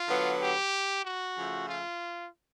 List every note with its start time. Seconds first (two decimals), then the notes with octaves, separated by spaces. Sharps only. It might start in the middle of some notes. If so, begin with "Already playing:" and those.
Already playing: F4
0.09 D3 F#3 B3
0.40 G4
1.04 F#4
1.37 C#3 F3 A3
1.68 F4